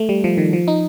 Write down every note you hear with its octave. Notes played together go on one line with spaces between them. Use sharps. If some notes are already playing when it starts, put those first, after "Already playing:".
Already playing: A3
G3
F3
D#3
F3
D#4